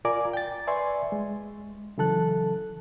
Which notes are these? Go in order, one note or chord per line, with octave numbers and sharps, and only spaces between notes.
F4 A#4 D5 G#5 A#5 D6
G5 A6
B4 D5 E5 G#5 C6 C#6
G#3
C#3 E3 F#3 A4 A5 F#6